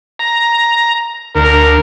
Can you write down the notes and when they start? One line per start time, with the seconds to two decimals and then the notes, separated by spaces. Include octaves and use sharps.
0.19 A#5
1.35 D2 A#4